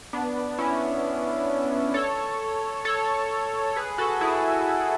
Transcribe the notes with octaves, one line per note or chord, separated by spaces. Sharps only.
B3 D4
C#4 E4
A4 C#5
A4 C#5
G#4 B4
F#4 A4
E4 G#4